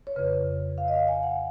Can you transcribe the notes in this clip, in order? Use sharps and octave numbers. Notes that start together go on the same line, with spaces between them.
C#5
F2 C#3 B4
F5
D#5
F5
G#5
F#5